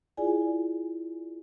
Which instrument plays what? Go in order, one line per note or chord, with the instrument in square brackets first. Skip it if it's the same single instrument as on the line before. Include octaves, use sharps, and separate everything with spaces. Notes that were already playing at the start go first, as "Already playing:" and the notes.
[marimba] E4 F4 G#4 D5 G#5